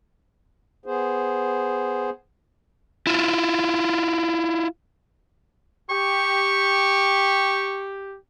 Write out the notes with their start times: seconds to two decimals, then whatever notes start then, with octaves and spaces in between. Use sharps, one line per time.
0.86 B3 G#4 C5
3.07 E4 F4
5.90 G4 C#6